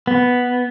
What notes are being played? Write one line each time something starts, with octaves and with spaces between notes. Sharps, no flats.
B3